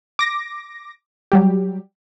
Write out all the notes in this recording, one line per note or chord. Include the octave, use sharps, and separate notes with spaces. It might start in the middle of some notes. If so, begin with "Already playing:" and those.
D6 A#6
F#3 G3 G4